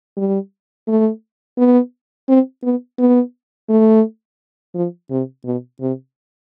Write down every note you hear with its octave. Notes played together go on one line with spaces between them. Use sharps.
G3
A3
B3
C4
B3
B3
A3
F3
C3
B2
C3